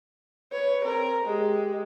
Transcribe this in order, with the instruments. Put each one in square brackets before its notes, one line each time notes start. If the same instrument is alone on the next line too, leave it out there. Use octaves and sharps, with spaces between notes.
[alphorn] B4 [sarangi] C#5
[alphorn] C4 [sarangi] A#4
[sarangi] G#3 [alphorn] G4